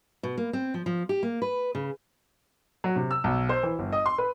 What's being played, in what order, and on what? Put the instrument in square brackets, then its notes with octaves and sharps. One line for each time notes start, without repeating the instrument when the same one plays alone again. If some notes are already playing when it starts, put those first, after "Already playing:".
[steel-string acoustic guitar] B2
A#3
C4
F3
F3
G4
A#3
B4
C#3
[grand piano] F#3
C3
E6
B1
C5
E3
G1
D#5
C6
B4